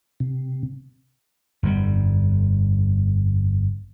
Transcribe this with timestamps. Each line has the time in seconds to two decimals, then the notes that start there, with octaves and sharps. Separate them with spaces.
0.20 C3
1.63 G1 F2 C#3 G3